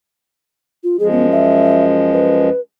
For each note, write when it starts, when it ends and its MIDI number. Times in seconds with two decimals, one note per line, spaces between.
0.84 0.97 65
0.99 2.50 42
0.99 2.50 53
0.99 2.50 56
0.99 1.11 68
1.11 1.27 59
1.32 1.84 76
2.13 2.60 71